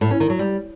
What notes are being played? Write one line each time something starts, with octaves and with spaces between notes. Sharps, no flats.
A2
C#4
D#3
F#3
G3